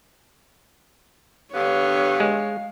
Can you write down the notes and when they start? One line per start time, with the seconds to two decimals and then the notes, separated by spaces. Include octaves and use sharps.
1.53 G2 D3 B3 C#5 F5
2.20 G#3